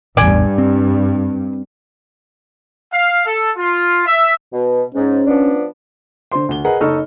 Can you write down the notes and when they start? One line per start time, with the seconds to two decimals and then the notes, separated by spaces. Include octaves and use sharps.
0.17 A1 E2 G2 D5 G#5
0.58 C4
2.92 F5
3.26 A4
3.56 F4
4.06 E5
4.52 B2
4.95 G#2 C#4
5.27 F3 B3 D4
6.32 D3 C5 C6
6.49 D2 G7
6.65 G#4 A#4 B4 D#5 F#5
6.80 F#1 D#4 A4 C#6 F6